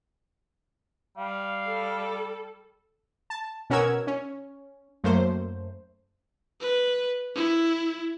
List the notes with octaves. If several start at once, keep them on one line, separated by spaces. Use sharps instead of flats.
G3 F5
A4
A5
B2 C#4 F#4 A#4 E6 G#6
C#4
F#2 A3 A#3 C5
B4
E4